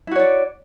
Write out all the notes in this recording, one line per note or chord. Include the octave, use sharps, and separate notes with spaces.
E4 F#4 C#5 D5